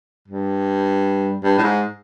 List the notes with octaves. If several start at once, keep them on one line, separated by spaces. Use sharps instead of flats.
G2
G2
A2
G#2